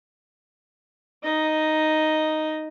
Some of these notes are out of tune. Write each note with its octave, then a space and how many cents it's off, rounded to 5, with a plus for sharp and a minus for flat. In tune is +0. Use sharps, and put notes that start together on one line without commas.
D#4 +0 D#5 +0